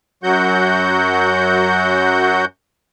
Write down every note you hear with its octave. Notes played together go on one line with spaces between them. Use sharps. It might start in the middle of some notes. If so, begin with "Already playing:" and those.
F#2 F#3 F#4 F#5 G6